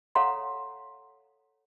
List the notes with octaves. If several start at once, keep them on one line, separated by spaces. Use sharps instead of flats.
A4 C#5 F5 F#5 A#5 C6